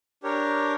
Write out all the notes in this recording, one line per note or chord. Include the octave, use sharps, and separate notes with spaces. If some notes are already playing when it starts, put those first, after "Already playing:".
D4 G4 A#4 C#5